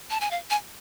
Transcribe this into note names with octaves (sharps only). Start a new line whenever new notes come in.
A5
G#5
F5
G#5